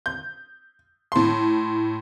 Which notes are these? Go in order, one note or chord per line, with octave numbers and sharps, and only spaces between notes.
G6
A2 C6